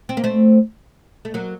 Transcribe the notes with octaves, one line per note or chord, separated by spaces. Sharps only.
C4
A#3
A3 C4
A3
F#3 A#3